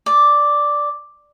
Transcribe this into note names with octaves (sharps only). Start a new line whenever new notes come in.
D5